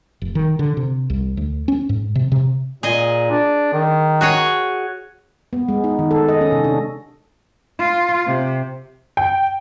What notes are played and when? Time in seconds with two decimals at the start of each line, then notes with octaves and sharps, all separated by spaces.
0.22 F1
0.35 D#3
0.59 D3
0.77 C3
1.10 C2
1.37 D2
1.68 C#4
1.89 G#2
2.15 C3
2.32 C3
2.83 A#2 G#4 D#5
3.31 D4
3.73 D#3
4.21 F#4 G#4 C#5
5.53 B3
5.68 G#3
5.84 D#4
5.99 D#3
6.11 A4
6.28 D#5
6.41 C#4
6.52 C3
6.64 D4
7.79 F4
8.26 C3
9.17 G5